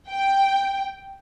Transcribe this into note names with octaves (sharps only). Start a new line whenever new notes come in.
G5